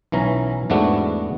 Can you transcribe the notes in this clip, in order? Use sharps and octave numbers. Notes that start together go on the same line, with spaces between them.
B1 E3 C#4 A#5
E2 G#2 A3 B3 D4 F#4